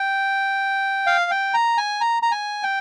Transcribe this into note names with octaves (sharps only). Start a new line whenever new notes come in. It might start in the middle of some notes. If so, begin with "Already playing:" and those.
Already playing: G5
F5
G5
A#5
G#5
A#5
A#5
G#5
G5